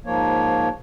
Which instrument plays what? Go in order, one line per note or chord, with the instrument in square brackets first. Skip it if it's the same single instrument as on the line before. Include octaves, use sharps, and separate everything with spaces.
[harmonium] G#2 F3 A#3 C#5